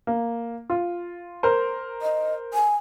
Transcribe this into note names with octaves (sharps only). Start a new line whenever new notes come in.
A#3
F4
A#4 C5
D#5
G#5